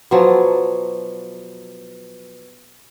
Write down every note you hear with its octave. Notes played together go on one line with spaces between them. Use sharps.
B2 F3 F#3